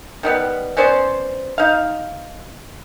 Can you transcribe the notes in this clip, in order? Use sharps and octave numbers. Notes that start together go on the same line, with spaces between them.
D#3 G3 B3 B4
B3 C#4 C5 D5
D#4 F5